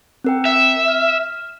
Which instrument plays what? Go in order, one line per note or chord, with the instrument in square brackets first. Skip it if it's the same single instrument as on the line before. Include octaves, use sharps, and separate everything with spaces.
[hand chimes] C4 A#4 G5
[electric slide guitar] E5
[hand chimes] F6